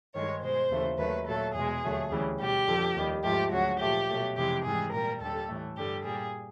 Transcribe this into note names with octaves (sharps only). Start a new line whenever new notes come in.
G2 D#3 G#3 C#5
B2 G#3 C5
D#2 C#3 E3 A3
D#2 D#3 F#3 A3 B4
A#2 F#3 A3 A4
E2 B2 G#3 G#4
D#2 D3 F#3 A3
D2 C#3 E3 G3
B2 G3 G4
F2 D3 F3
D#2 D#3 G3
G#2 F3 A3 G4
D2 C#3 F#3 F#4
A#2 F3 A3 G4
B2 F#3 A3
F2 C3 E3 G#3 G4
G#2 E3 G3 G#4
A#2 G3 A#4
D#2 D3 G3 A4
A2 E3 A3
G2 D3 G3 G4
A#2 G3 G#4